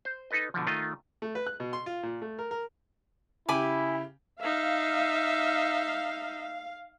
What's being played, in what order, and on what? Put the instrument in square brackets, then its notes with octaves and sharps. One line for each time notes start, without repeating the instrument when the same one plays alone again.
[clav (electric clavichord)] C5
D#4 A4 B4 D#5
B2 D3 F3
D#3 A3 F4 D#5
[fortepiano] A3
B4
F#6
B2
C6
F4
A#2
A3
A#4
A#4
[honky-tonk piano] C#3 G4 [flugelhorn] E4 [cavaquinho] G#5 B5 D6
[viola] D#4 E5 [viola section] F5